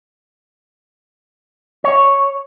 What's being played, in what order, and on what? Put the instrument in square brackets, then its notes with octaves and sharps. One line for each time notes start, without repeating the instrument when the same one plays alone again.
[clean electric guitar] C#5